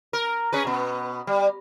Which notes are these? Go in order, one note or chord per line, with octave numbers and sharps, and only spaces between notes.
A#4
C#4 G#4 B4
B2 B3
G3